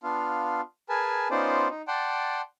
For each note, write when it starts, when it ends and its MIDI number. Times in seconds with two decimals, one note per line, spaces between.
0.03 0.61 59
0.03 0.61 62
0.03 0.61 65
0.03 0.61 77
0.89 1.28 68
0.89 1.28 70
0.89 1.28 71
0.89 1.28 80
0.89 1.28 81
1.31 1.68 59
1.31 1.68 61
1.31 1.68 63
1.31 1.68 65
1.31 1.68 72
1.31 1.68 74
1.70 1.82 63
1.88 2.41 74
1.88 2.41 78
1.88 2.41 79
1.88 2.41 81
1.88 2.41 84